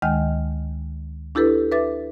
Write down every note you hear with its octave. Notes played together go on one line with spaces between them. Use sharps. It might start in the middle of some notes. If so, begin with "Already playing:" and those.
D2 D#3 G#3 D#5 G5 F6
D4 E4 G4 A4 B4
B4 E5 D6 A6